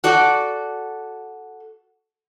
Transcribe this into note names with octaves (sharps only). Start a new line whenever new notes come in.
F#4 A4 D5